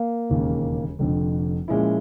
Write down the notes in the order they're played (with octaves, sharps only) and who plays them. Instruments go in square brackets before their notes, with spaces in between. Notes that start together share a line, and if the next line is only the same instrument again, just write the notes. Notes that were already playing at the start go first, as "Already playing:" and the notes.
Already playing: [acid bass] A#3
[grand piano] E1 D#2 C#3
F1 F2 D3
A#2 F3 G#3 C#4 E4